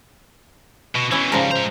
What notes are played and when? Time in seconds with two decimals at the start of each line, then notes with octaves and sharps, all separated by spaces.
0.95 B2
1.11 B2 E3 C#4 E4 G#5
1.32 G#2 C#3 F3 G3 A#4
1.51 G#3 C5 A#5